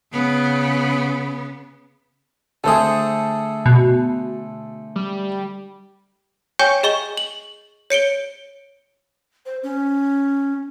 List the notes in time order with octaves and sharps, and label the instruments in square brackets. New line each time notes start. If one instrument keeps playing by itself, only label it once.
[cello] C#3 B3
[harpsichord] D3 A3 G#4 [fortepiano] A4 C5 D#6
[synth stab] B2
[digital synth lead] G3
[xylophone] C#5 G5 G#5 C#6 G6
G#4 D#5 C#6 G7
F#7
C#5 C#7 D7 G7
[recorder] C5
C#4